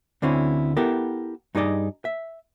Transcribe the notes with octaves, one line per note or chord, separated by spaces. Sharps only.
D2 D3 C4 C#4 E4
B3 E4 G4 A4 A#4
G2 D#4 G#4 D5 D#5
E5